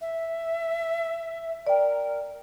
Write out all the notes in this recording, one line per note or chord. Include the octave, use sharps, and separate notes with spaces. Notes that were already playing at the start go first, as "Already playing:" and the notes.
E5
A#4 D5 G5